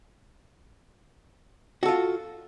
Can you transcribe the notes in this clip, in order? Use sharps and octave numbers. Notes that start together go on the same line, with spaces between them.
F4 F#4 A4